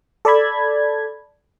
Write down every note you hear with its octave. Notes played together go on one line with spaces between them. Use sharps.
A4 D5 A5 B5 G#6